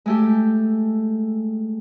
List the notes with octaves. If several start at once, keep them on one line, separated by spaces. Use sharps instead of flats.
G#3 A3 G4